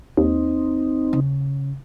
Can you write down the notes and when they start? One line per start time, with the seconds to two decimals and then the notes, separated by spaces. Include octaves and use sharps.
0.17 D#2 C4 D#4
1.13 C#3